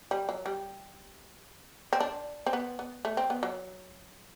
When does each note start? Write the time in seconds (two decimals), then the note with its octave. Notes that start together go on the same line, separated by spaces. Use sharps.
0.11 G3
0.29 F#3
0.46 G3
1.93 C4
2.00 D4
2.46 C4
2.53 B3
2.79 B3
3.05 A3
3.17 C4
3.30 B3
3.43 F#3